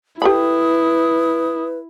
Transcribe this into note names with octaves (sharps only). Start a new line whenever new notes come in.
E4 G4 A4 B4 B5 D#6